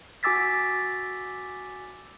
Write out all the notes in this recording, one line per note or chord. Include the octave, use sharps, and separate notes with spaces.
F#4 G#5 D6 E6 A6 B6